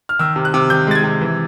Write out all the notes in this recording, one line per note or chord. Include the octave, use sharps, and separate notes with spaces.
F6
D#3 E6
C3
F#6
C3
D#3 G6
G#3 A6
G#6
C3
E3